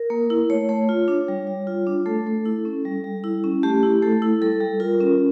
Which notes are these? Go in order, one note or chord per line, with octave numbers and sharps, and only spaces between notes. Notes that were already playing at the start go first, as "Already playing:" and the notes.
Already playing: A#4
A#3
E4
A3 C#5
A3
F4
D4
G3
G3
F4
D4
A3 A4
A3
E4
C#4
G3
G3
E4
C#4
A3 G4
E4
A3 A4
E4
G3 A4
G3
F4 A#4
C#4